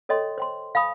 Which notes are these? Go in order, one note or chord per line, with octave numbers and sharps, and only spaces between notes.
A4 C#5 D#5 G5 C6
C5 G5 C6
F5 G#5 B5 D#6